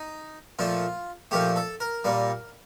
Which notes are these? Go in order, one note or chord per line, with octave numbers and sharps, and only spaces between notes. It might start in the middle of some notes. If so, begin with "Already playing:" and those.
Already playing: D#4
A#2 F3 A3 F4
A#2 F3 A3 G4
A4
A#4
A#2 G3 A#3